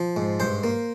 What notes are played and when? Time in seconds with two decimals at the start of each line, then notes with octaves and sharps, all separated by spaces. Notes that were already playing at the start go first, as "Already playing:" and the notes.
Already playing: F3
0.17 G#2
0.40 G2 C5
0.63 A#3